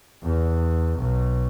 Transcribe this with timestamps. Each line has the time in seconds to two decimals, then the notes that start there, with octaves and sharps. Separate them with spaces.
0.24 E2
0.98 B1